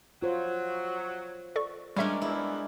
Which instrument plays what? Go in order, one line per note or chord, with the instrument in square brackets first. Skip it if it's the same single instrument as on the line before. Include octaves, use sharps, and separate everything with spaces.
[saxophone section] F#3 [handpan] F4 C5
[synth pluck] A4 D5 C#6
[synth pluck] G3 E5 [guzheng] G#3 A#3 D4 [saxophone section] C#4
[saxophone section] E2 [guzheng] E4